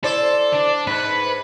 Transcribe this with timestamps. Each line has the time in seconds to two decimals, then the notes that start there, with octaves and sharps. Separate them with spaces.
0.04 E4 A4 C5 D5
0.53 D4
0.87 G#2 B4